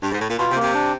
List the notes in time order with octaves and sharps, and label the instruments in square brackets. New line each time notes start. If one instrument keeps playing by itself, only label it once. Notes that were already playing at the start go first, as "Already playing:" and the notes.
[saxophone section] G2
G#2
A2
A#2
[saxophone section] B2 [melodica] F4
[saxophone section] C3
[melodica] A#3
[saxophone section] C3
[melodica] D4